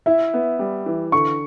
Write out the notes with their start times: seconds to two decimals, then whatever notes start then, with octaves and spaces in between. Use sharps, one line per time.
0.06 E4 E5
0.34 B3
0.59 G3
0.86 E3
1.12 D3 C#6